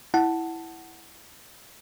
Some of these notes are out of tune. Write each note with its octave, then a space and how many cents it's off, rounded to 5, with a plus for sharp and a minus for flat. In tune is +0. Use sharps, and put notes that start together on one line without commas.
E4 +0 F#5 +5 A5 +0